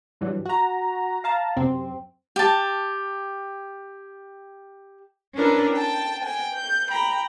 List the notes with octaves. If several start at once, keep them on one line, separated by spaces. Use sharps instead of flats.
G2 E3 F#3 G3
F#4 A#5
F5 A5 A#5
F#2 C3 C4
G4 A5
C#4 D4 E4 A#4 B4
G5 A5
G5 G#5
G6
G5 A#5 B5